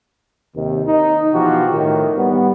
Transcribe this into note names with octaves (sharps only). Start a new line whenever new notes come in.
D#2 C3 D#3
D#4
B2 E3 F3 F#4 G4
A2 D#3
G3 B3